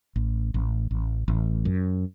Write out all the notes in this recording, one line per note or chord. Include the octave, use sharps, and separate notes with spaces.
A1
A1
A1
A1
F#2